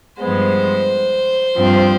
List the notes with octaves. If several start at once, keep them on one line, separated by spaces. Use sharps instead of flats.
G2 F3 G#3 B3 C5
G2 F3 C4